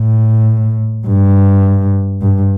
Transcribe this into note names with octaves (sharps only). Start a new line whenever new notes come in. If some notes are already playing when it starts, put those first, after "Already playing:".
Already playing: A2
G2
G2